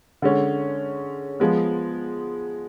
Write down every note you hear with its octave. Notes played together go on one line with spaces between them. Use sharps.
D3 G#3 C#4
F3 G#3 B3